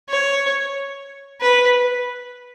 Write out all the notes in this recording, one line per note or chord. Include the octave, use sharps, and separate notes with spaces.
C#5
B4